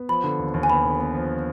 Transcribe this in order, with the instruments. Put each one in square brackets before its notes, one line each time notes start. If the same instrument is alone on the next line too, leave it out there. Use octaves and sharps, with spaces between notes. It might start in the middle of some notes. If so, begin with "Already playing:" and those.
Already playing: [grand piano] B3
[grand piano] F3 [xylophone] B5
[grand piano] D3
D#2
D#2
[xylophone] G#5
[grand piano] B3 [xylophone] B5
[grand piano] D3
B3
F3